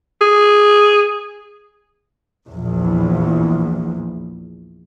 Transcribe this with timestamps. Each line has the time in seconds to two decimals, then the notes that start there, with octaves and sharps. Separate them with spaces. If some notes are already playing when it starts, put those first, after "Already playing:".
0.21 G#4
2.47 A#1 E2